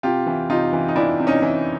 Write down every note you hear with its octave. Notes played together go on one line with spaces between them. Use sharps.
C3 F4 G4
E3
C3 D#4 F4
E3
D#4
E3 D4 E4
C3
C#4 D#4
E3